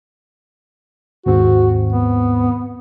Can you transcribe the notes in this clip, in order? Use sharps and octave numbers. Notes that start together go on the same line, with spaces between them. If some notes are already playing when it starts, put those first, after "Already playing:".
D#2 G#2 C4 F#4
B3